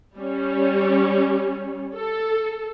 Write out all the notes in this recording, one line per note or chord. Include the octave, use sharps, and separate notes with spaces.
G3 C#4
A4